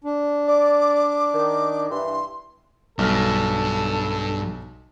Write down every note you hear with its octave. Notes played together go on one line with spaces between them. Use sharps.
D4
D5 D6
D#3
G2 E3 C6
B1 G2 A4 F6